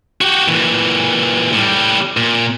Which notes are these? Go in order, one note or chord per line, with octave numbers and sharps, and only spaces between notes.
F#4 G4
A#2 E3
A2 G3
A#2